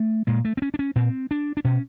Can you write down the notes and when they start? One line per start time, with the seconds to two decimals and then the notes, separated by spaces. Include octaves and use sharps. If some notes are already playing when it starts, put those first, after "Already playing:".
Already playing: A3
0.27 A#2 G#3
0.45 A3
0.57 C4
0.62 C#4
0.74 D4
0.79 C#4
0.96 A#2 C4
1.31 D4
1.57 D4
1.64 B2 C#4